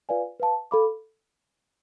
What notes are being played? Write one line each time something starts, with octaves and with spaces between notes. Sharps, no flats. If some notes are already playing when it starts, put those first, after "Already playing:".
F4 B4 D5 F5 G#5
B4 F5 A5
A4 F5 B5 D6